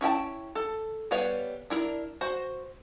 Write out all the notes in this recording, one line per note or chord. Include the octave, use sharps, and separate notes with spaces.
C#4 E4 G5 A5
A4
G3 B3 B4 C#5 F5
D4 E4 A#4
F#4 C5